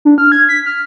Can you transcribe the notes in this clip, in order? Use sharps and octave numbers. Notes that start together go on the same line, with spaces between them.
D4
F6
G#6
B6
F6